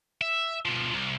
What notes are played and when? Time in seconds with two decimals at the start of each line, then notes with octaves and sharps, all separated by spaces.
0.21 E5
0.65 B2 F3
0.93 C2